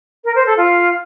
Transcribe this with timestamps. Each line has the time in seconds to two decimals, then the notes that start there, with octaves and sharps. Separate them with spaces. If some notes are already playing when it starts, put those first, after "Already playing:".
0.24 A#4
0.35 C5
0.46 A4
0.57 F4